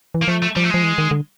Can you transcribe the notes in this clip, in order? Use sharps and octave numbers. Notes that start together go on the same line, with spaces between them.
E3
A#3
F3 A3
A3
F3 G3
A3
F3 G#3
E3
D#3
D3